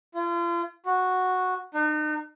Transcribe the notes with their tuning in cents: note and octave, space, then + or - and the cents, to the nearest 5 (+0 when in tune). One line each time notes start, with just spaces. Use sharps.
F4 -35
F#4 -5
D#4 -40